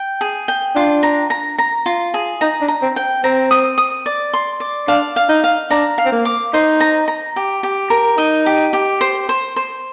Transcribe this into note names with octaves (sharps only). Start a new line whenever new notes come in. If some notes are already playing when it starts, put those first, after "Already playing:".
Already playing: G5
G#4
G5
D4 F4
A#5
A#5
A#5
F4
G#4
D#4 A#5
D4
A#5
C4
G5
C4 A#5
D#6
D#6
D5
C6
D5
D4 F5
F5
D#4
F5
D4 A#5
F5
C4
A#3
D6
D#4 C5
A#5
A#5
G4
G4
A#4
D#4 D#5
G4
G4
C5
C5
C5